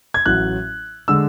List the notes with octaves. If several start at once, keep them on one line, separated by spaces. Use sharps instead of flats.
G#6
A1 A2 F#3 F#6
D3 G#3 E6